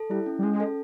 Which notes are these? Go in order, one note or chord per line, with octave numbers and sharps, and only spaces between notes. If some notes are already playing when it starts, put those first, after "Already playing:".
Already playing: A4
G3 E4
C#4
G3
G#3 C#4
A4